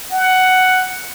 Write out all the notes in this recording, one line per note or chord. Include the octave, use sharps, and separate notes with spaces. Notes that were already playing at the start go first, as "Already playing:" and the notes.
F#5